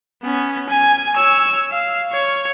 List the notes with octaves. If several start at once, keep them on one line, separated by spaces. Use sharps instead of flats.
B3 C#4
G#5
C#5 E6
F5
C#5